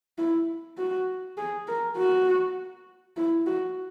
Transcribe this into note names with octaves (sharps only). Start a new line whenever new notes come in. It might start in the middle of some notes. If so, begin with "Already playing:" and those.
E4
F#4
G#4
A#4
F#4
E4
F#4